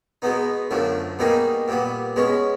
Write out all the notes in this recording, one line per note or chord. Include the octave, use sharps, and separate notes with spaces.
B2 G#3 B3 D#4
F#2 D3 F3 A3
B2 G3 A#3 D#4 G#4
A#2 G3 B3
B2 G#3 C#4